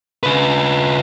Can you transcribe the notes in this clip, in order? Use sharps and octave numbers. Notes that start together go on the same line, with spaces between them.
C#3 B4